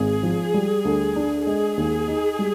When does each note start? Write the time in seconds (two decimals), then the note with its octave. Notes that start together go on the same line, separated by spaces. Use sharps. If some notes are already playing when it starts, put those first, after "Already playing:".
Already playing: G#1 G#4
0.23 F3
0.54 G3
0.85 D2
1.16 D4
1.47 G#3 G#4
1.77 D#2
2.08 D#4
2.39 G3